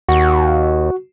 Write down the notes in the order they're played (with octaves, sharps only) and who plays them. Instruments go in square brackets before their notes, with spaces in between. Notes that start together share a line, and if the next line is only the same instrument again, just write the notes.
[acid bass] D#2 [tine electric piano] F#4